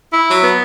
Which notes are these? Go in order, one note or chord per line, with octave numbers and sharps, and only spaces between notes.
E4
F#3
B3